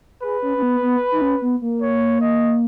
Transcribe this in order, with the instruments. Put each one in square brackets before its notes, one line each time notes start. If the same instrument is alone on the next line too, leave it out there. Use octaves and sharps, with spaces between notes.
[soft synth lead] G#4 [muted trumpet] B4
[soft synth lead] C#4
C#4
B3
B3
D#4
C#4
B3
A#3
[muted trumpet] C#5
D#5